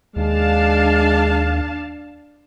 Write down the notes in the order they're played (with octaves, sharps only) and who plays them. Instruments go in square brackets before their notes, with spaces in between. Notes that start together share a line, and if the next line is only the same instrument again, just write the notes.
[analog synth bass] D#2 [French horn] G#3 [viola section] D4 F5 A5